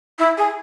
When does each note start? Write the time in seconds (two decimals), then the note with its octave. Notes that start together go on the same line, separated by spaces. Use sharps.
0.18 E4
0.37 G#4